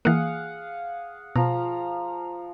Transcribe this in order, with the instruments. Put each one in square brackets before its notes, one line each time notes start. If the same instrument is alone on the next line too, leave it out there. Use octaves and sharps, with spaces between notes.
[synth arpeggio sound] E3 A#3 [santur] G#4 F5 F#5
[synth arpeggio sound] B2 [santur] F3 A#5